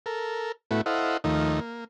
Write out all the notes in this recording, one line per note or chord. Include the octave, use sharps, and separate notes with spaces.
A4 A#4
A2 A3 B3 E4 F#4
E4 A4 C5 D#5 F5 F#5
D#2 D#3 F3 A3 D#4
A#3